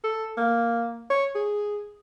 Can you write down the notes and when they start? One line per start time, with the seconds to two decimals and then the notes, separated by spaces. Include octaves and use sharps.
0.04 A4
0.37 A#3
1.10 C#5
1.35 G#4